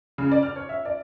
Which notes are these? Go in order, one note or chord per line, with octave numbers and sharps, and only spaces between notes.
C#3
D5
F6
C#5
E5
D5